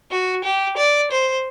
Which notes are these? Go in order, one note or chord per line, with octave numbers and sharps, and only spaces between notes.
F#4
G4
D5
C5